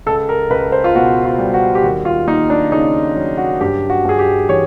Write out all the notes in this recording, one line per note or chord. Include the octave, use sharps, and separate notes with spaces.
C#2 A4
A#4
C#2 B4
C5
F4
B2 F#4
F4
G3
F#4
G4
D#2 F#4
F4
A#3 D#4
D4
C#3 D#4
F#3
F#4
G2 G4
F#4
G2 G#4
G4
E3 C#5